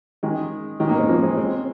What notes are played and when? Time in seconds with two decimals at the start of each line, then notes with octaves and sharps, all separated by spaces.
0.23 D#3 G#3
0.80 D#3 G#3
0.89 A#3 D#4
0.99 G#3 C4
1.09 F3 A#3
1.23 G#3 C4
1.38 G#3 C4